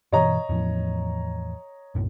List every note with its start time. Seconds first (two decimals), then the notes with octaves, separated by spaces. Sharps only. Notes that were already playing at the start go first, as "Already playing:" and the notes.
0.12 G2 B2 E3 C#5 D#5 A#5
0.49 E2 A2 F3
1.95 B1 F#2 A2